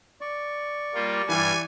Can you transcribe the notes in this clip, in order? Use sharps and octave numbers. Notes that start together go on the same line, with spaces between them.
D5 C#6
G3 A#3 F4
G2 E3 G3 G#5